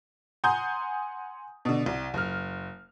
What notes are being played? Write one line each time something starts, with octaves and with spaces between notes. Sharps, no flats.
F#5 G#5 A#5 C6 D#6 G6
B2 D3
C2
F#1 F6